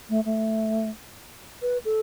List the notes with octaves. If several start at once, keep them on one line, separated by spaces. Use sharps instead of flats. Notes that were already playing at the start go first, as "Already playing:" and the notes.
A3
A3
B4
A4